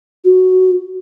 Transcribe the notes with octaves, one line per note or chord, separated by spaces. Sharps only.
F#4